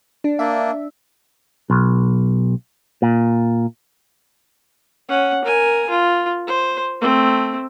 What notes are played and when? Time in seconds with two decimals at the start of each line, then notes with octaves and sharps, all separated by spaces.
0.24 D4
0.39 A#3 D4 E5
1.70 B1
3.02 A#2
5.09 C#4 F#5
5.44 A#4 G#5
5.89 F4
6.47 C5
7.01 A3 C4